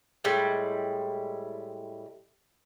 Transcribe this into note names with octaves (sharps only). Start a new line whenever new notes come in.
A2 G3 G#3